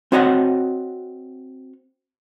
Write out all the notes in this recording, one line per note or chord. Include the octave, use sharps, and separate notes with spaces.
C4 F#4 C#5 D#5 F5 F#5